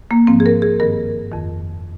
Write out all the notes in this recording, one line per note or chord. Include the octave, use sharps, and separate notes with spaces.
A#3
G#2 F3 C4
G#4
A#4
G#4
G2 D#3 A#4
F2 D#3